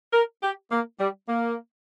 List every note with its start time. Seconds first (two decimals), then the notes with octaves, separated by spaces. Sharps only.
0.13 A#4
0.43 G4
0.71 A#3
0.99 G3
1.28 A#3